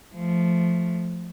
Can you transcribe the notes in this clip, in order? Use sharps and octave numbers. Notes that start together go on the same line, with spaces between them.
F3 A3